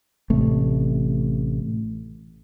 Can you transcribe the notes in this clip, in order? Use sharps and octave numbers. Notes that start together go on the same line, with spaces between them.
A1 C3 A3